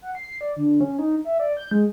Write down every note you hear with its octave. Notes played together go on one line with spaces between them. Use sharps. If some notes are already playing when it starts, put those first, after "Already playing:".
F#5
C7
D5
D3
C#4
D#4
E5
D5
G6
G#3